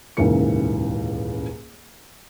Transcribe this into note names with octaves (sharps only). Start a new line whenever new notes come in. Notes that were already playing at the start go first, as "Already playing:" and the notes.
D#1 C#2 G#2 E3 A#4 C#7